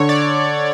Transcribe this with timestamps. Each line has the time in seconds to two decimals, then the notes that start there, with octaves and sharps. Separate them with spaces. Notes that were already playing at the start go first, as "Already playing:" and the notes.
Already playing: D3 C#5
0.09 D5